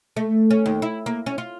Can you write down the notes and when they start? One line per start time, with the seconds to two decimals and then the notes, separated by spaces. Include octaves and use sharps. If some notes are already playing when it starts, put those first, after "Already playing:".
0.17 A3
0.51 C#4
0.66 D#2
0.82 E4
1.06 A#3
1.26 C#4
1.38 F4